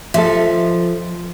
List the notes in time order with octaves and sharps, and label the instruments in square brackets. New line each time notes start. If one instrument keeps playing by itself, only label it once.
[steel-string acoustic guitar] F3 [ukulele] A4 D#5 E5